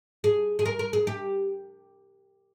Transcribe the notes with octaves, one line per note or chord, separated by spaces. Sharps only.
G#4
G#4
A#4
A#4
G#4
G4